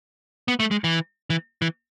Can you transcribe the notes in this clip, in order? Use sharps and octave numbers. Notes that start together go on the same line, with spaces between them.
B3
A3
G#3
E3
E3
E3